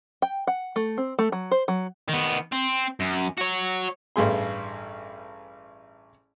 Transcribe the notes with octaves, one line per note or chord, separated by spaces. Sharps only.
G5
F#5
A3
C4
A3
F#3
C5
F#3
D#3 B3
C4
F#2
F#4 C#5
A1 G2 G#4 C6